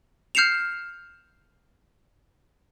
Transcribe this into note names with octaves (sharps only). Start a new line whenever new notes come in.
F6 G6 C7 C#7 E7 F7